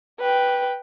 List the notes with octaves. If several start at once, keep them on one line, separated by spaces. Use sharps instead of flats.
B4 G5